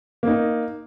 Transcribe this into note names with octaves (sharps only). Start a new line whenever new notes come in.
A#3 D#4